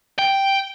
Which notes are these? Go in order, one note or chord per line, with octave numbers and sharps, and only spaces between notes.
G5